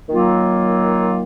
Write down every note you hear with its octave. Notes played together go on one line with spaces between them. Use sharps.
D#3 F#3 A#3 F4